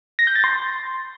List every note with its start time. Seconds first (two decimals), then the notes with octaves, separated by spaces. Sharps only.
0.19 A#6
0.27 G6
0.35 A6
0.44 C6